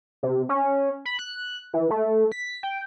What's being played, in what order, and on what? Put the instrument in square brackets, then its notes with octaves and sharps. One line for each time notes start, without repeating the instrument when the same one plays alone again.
[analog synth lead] C3
C#4
B5
F#6
E3
A3
B6
G5